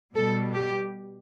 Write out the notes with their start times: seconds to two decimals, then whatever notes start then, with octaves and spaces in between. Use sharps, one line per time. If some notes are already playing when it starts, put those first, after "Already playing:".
0.14 B2 G3 A4
0.54 G4